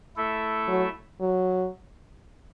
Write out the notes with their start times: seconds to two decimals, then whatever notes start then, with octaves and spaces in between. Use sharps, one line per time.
0.16 A3 E4 A4 E5
0.68 F#3
1.21 F#3